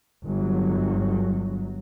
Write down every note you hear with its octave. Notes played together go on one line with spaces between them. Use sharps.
G1 F#3